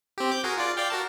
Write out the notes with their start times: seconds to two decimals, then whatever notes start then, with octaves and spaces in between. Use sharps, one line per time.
0.18 C4 G4
0.31 D6 G6
0.44 F#4 G#4 A#4
0.57 F4 D5
0.77 D5 F5 G5
0.90 F#4 A#4 A5